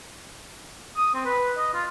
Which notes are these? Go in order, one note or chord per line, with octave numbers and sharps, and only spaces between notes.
D#6
C4
B4
D#5
F4